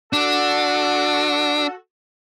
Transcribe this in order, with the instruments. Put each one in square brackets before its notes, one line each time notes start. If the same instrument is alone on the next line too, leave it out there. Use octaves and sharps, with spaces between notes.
[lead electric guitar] D4 [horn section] F#4 A4